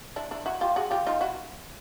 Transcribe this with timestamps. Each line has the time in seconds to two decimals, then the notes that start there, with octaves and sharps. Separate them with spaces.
0.16 D4 E4
0.31 D4 E4
0.46 E4 F#4
0.61 F4 G4
0.76 F#4 G#4
0.91 F4 G4
1.06 D#4 F4
1.21 E4 F#4